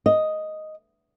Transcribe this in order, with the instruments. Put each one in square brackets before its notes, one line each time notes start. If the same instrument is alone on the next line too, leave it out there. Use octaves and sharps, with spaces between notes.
[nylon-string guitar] D#5